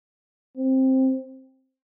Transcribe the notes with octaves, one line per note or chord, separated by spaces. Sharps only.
C4